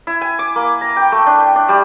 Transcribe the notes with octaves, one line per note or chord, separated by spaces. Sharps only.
E4
G#5
D6
A#3
A#5
G5
A3
D4
G5
D4
G3